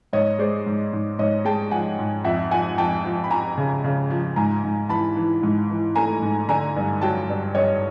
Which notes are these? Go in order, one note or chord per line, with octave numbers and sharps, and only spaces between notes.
G#2 C#5 D#5
G#3 C5 D5
G#2
G#2
G#2 C#5 D#5
G#3 G5 A5
F3 F#5 G#5
G#2
F2 E5 F#5
F3 F#5 G#5
F2 G5 A5
F3
B5
F3 G#5 A#5
C#3
C#3
F3
G#2 G#5 A#5
G#2
E3 A5 B5
E3
G#2
E3
A3 G#5 A#5
G#2
D3 G#5 A#5
G2
F#3 G5 A5
G2
G2 C#5 D#5